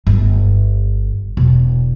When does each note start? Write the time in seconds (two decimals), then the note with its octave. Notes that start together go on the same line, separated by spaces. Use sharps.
0.07 G1
1.37 E1